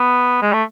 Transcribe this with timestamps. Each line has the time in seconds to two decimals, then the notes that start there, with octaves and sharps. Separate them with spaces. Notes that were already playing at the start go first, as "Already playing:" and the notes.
Already playing: B3
0.42 G#3
0.53 A3